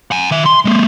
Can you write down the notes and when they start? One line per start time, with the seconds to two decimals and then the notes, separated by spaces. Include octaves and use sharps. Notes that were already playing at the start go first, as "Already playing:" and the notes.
0.11 F#5 G#5
0.31 D#3 E5
0.46 C6
0.65 G#3 A#3